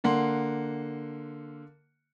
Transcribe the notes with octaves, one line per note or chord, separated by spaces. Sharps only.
D3 A#3 F#5 C6